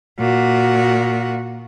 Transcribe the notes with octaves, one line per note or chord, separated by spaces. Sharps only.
A#2 F#4